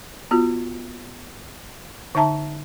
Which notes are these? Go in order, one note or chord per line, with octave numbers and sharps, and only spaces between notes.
B3 F4 F#4
D3 D#4 E5 A5 A#5